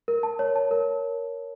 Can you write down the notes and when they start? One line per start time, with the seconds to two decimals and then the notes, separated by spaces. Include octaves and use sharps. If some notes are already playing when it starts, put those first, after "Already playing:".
0.08 A#4
0.23 A5
0.39 C#5
0.56 A5
0.71 A#4